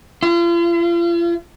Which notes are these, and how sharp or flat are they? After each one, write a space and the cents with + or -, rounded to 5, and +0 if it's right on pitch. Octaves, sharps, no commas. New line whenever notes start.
F4 -40